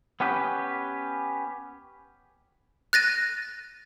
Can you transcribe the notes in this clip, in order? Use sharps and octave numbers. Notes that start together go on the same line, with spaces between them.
B3 C#4 G4 B4
F#6 A6 A#6 D#7